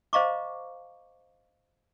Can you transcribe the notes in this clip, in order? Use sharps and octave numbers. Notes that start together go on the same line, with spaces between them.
C5 D#5 F5 A#5 C#6 D6